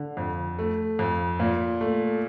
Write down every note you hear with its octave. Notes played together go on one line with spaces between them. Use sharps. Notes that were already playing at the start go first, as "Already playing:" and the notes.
Already playing: D3
F2
A3
F2
A#2
A3